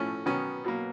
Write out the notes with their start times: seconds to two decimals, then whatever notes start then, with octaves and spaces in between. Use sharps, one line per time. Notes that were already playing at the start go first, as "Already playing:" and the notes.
Already playing: A2 F3 A3 C#4
0.26 D#3 F#3 B3 C#4
0.64 B2 F#3 A#3